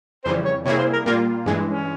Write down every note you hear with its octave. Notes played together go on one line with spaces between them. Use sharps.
F2 C#3 E3 G3 C5
C#5
C3 G3 A#3 E4 G#4 C#5
C5
A#4
A#2 G3 A#3 F4 A#4
G2 E3 G#3 G#4
C#4